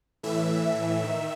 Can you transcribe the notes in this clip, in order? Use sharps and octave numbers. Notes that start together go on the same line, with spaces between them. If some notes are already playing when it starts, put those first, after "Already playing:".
A2 E3 E5
D#3